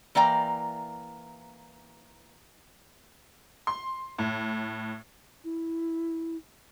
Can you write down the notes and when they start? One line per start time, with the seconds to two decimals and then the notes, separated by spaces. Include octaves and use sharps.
0.15 E3 A#3 D5 G5 A#5
3.67 C6
4.19 A2
5.44 E4